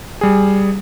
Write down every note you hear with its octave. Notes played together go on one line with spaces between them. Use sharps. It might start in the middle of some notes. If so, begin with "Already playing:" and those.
G3 G#4